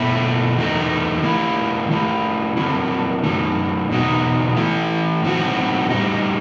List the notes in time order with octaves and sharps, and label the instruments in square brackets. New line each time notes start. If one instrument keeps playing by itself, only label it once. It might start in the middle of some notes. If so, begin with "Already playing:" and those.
Already playing: [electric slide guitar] B2 A3 E4
E2 D#3 A3 D#4
D#3 A3 E4
D#3 A3 E4
D#3 F#3 C4 E4
F#2 D#3 F#3 A3 D#4
E2 B2 G3 D#4 F#4
E3 A3 E4
A2 F#3 C4 D#4 F#4
A2 G3 D#4